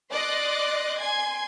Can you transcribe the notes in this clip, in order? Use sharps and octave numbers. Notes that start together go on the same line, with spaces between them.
D5 D#5 C6 D6 F#6
G#5 C6 G#6